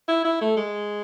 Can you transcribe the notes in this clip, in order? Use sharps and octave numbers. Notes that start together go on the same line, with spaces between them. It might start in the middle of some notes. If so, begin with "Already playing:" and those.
E4
E4
A3
G#3